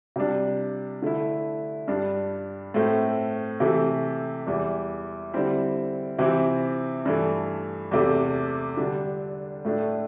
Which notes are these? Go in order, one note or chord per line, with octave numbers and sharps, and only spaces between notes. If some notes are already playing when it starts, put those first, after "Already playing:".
C3 G3 D4
D3 A3 E4
G2 G3 D4
A2 A3 C4
C3 E3 A3
E2 E3 G3 E4
D3 G3 C4 E4
C3 E3 C4 E4
G2 E3 A3
E2 C3 A3
D3 G3 D4
A2 A3 D4